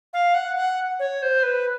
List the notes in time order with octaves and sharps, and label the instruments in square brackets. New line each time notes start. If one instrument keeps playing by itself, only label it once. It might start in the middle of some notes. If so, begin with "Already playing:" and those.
[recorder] F5
F#5
F#5
C#5
C5
B4